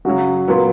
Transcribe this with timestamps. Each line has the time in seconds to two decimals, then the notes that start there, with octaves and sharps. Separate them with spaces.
0.05 F#2 C#3 F#3 F#4
0.48 A#2 F#3 B3